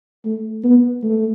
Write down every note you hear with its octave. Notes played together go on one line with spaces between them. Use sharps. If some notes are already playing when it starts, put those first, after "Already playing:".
A3
B3
A3